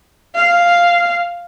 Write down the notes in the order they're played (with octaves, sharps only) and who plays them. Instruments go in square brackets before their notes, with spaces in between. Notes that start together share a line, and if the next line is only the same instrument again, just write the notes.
[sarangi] F5